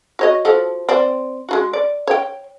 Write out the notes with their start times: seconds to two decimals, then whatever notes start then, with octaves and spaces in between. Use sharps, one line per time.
0.19 F#4 C#5 D#5
0.45 F3 F#4 A4
0.89 C4 D5
1.49 G#3 F4 F#4
1.73 D5
2.07 C#5 G5